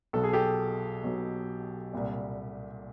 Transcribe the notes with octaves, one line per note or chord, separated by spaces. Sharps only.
B1 B2 F#3 A4
G#4
G4 A4
B1 B2 F#3
C2 A#2 G3